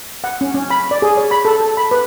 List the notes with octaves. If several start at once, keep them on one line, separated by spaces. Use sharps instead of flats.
F#5
C#4
C#4
B5
D5
G#4
C#5
B5
A4
A4
B5
B4